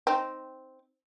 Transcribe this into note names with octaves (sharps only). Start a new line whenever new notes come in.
C4 D#4